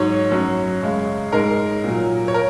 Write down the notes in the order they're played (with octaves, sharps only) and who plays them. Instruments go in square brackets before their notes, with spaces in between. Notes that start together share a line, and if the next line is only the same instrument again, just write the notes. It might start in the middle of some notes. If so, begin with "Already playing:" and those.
Already playing: [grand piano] G#2 F#3 C#5
F#2 F#3
F#2 C#3 G#3
G#2 G#3 A#4
A#2 F#3
C#5
A#4